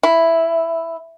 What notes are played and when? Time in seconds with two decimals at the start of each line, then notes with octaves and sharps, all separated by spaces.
0.03 E4